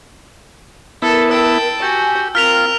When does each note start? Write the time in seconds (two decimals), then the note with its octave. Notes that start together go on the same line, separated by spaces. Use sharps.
1.02 B3 E4 A4 A#4
1.31 G5 A5 E6
1.82 F#4 G4 G#5
2.35 C4 F4 A#4 F6 B6 F7